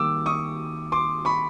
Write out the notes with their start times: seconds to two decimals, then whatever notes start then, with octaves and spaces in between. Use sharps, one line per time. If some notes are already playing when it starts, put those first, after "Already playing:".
Already playing: D#3 G3 A#3 D6 E6
0.26 C#6 D#6
0.92 C6 D6
1.25 B5 C#6